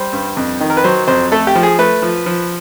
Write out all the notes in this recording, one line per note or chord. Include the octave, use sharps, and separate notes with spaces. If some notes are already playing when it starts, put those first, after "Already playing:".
Already playing: G3 C5
G2
F2
D#3
A#4
B4
F#3 C5
F2 C5
A3 A4
G4
F3
G#4
A3 B4
F3
F3